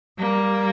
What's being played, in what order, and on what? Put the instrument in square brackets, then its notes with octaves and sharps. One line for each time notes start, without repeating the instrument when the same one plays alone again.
[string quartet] G3 A#3